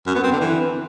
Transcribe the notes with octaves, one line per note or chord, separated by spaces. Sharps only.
F#2
B3
C4
D3
E3